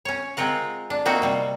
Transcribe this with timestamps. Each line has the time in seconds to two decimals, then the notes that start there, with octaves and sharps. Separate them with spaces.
0.05 C#4 C#5
0.37 G#3 C4 F4 A#4 F#5
0.90 D4
1.05 A#3 C4 D#4 F#4
1.22 C3 G3